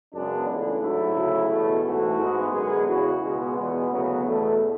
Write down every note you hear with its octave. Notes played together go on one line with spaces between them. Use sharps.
F#2 C#3 G#3 B3 D4
C#2 C#3 E3 A3 D4
G#2 F#3 A3 E4
D2 C#3 F#3
E2 B2 A3
A1 G#2 E3 A3 F#4
G#2 G#3 B3
F#2 D3 G#3 B3 G#4
E2 C#3 E3 F#4
C#2 B2 G#3 B3 F#4
E2 B2 G#3 B3
D2 C#3 F#3 B3
E2 B2 A3